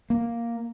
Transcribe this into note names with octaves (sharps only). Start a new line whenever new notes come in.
A#3